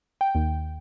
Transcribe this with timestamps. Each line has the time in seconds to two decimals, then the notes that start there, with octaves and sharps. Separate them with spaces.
0.21 G5
0.35 D#2